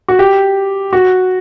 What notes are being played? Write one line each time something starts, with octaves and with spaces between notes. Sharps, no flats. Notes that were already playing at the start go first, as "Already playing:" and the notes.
F#4
G4
F#4